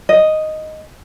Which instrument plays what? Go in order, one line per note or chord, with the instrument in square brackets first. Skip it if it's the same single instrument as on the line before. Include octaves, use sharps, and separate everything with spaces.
[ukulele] D#5